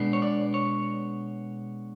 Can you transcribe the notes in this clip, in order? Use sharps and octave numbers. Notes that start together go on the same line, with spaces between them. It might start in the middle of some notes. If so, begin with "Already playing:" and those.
Already playing: B2 G#3 B3 D4
C#5
D5
C#5